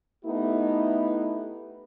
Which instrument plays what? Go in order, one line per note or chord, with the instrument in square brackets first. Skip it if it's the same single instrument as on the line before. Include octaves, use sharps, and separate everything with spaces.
[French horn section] A3 B3 D#4 E4 G4